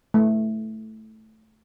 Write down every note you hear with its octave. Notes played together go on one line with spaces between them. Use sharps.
A3